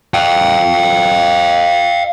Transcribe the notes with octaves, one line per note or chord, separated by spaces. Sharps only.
F5 G5